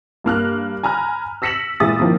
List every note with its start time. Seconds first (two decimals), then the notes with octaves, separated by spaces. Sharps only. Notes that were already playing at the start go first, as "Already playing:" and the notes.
0.24 G2 A#3 F6 F#6
0.83 G#5 A#5 B5 F6 F#6
1.42 E6 A#6 B6 C#7 E7 F#7
1.80 A#2 E3 G#3 E5 D#6 A6
2.00 D#3 F3 A#3